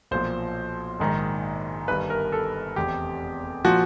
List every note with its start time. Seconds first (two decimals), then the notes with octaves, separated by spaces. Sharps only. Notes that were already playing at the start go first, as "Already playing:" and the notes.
0.11 B1 A#2 F3 C5
1.00 A#1 G#2 D#3
1.88 G1 G2 D#3 B4
2.10 A#4
2.32 A4
2.76 F1 E2 C3 G4
3.65 A#2 F3 F#4